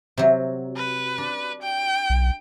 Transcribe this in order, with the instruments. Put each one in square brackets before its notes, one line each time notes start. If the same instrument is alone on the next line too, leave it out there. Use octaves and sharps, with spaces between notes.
[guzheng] C3 F#3
[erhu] B4
[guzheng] D4
[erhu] G5
[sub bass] B1